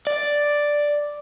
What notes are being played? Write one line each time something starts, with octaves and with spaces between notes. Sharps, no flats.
D5